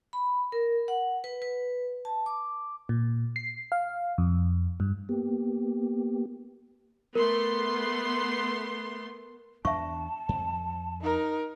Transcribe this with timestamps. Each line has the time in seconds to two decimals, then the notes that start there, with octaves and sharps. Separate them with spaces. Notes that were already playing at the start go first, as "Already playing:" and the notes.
0.13 B5
0.52 A#4
0.88 F#5
1.24 B4
1.42 B4
2.05 A5
2.26 D6
2.89 A#2
3.36 C7
3.72 F5
4.18 F2
4.80 G2
5.09 A#3 B3 G4
7.15 A3 B3 A#4 C6
9.65 E2 D4 E5 A5 C#6
10.29 F2
11.01 D#4 A#4